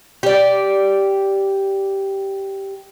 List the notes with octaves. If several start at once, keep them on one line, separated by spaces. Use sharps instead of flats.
G4 D5